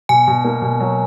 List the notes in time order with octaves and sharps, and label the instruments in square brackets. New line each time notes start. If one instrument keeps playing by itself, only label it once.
[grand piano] B2 [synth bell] G#5
[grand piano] B2
A#3
B2
F#3